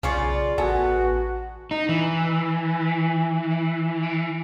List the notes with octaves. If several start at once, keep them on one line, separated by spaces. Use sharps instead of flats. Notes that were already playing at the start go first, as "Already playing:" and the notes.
B1 C#3 C#4 F4 D5 C#6
A1 B3 F#4 A4 G#5
D#4
E3